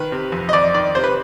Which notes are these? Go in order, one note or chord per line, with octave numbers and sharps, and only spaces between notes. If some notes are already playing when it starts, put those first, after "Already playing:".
Already playing: D#3 B4
C3
F2
D#5
F2 D5
D#3 D5
C3 C5
B4